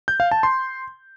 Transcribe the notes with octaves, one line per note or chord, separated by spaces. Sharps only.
G6
F5
A5
C6